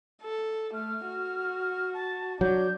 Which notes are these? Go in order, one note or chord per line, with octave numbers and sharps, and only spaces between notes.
A4
A3 F6
F#4
A5
F#3 D4 G6